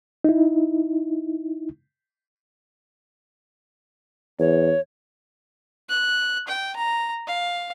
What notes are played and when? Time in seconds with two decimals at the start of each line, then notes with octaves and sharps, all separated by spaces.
0.24 D#4 E4
4.39 E2 C#5
5.89 F#6
6.48 G5
6.76 A#5
7.27 F5